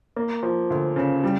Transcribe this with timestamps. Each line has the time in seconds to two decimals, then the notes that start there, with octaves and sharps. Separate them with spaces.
0.16 A#3
0.43 F3
0.70 D2
0.96 C#3
1.24 G3